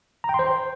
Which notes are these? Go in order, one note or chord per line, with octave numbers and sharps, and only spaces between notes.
A#5
G5
C6
C5